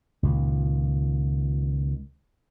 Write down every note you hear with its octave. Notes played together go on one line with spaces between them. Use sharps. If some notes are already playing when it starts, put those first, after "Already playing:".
C#2 A#2 D#3